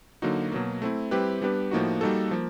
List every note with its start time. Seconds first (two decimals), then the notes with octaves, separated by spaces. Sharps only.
0.22 D3 F#3 A#3 D#4 F#4
0.52 B2 F#3 A#3
0.82 A3 C4 E4
1.11 G3 C4 E4 G4 B4
1.42 G3 B3 D4 G4 B4
1.71 A2 F3 A#3 D#4 F#4
2.01 G3 A#3 D#4 F#4 A4
2.31 F3 A#3